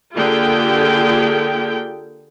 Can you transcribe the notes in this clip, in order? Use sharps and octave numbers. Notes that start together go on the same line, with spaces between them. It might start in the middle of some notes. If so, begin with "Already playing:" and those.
D3 A#3 F4 G4 G#4 G5